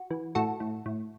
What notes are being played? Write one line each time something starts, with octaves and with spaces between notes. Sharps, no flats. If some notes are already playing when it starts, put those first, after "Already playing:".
Already playing: F#4
E3
A2 F#4 A4
A2
A2